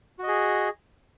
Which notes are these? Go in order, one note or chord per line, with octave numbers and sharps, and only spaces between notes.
F#4 G#4 D#5